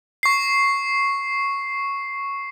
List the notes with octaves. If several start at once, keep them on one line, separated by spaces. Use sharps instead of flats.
C#6 C7